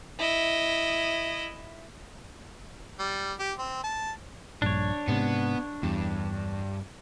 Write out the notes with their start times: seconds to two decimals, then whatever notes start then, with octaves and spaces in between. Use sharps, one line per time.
0.19 E4 D#5
2.99 G3
3.39 G4
3.58 C4
3.84 A5
4.62 A#1 G2 D4 C#5
5.08 G#2 C3 B3
5.83 E2 G2